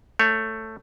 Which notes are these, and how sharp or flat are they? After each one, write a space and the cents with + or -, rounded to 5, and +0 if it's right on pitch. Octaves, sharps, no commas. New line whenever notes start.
A3 +10 C#5 +0